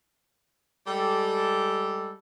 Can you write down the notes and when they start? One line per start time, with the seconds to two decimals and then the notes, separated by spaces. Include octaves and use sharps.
0.87 G3 G#3 G4 A4